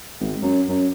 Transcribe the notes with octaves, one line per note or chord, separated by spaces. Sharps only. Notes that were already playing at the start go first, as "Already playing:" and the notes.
G#1
F#2
F#2